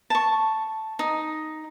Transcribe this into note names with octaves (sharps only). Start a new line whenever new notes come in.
A5 C#6
D#4